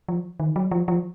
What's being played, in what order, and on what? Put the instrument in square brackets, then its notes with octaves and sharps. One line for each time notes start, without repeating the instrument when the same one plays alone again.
[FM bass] F3
D#3
F#3
F3
F3